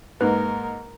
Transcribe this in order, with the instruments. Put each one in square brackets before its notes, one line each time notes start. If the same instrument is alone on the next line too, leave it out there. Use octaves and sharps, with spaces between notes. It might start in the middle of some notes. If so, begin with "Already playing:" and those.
[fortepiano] G#2 A#3 D#4 [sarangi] A#4 [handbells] B4